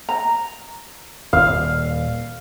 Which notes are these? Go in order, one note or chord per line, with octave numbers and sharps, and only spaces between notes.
A#5
D#1 F5